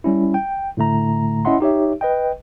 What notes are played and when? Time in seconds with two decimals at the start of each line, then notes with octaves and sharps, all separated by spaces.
0.04 G3 C#4 E4
0.34 G5
0.77 A2 D3 A3 A#5
1.45 C#4 E4 D#5 E5 F#5 C6
1.60 D#4 G4 C#5 E5
2.01 B4 D#5 G5